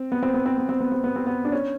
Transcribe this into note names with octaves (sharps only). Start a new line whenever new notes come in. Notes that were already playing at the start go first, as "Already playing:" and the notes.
Already playing: C4
B3
C4
B3
C4
B3
C4
B3
C4
B3
C4
B3
D4
C#4